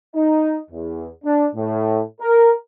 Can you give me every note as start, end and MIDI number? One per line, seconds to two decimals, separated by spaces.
0.15 0.57 63
0.71 1.06 40
1.25 1.47 62
1.55 2.01 45
2.21 2.52 70